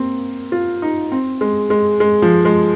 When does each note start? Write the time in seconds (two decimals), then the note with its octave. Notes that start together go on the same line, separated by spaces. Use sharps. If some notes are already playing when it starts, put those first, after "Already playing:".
Already playing: A#3 C4
0.52 F4
0.82 D#4
1.12 C4
1.41 G#3
1.70 G#3
2.00 G#3
2.22 F3
2.45 G#3